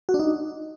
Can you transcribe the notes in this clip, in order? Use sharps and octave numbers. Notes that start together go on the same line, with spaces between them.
F#4
D4
D#4